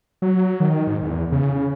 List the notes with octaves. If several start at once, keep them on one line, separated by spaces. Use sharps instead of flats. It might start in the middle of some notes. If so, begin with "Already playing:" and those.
F#3
D#3
G#2
E2
C#3
C#3